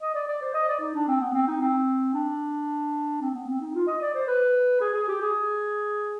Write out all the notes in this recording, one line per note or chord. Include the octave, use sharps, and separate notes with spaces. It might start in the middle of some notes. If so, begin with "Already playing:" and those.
D#5
D5
D5
C5
D#5
D5
D#4
D4
C4
B3
C4
D#4
C4
D4
C4
B3
C4
D#4
F4
D#5
D5
C5
B4
G#4
G#4
G4
G#4